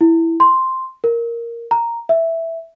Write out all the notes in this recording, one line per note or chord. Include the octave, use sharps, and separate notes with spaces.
E4
C6
A#4
A#5
E5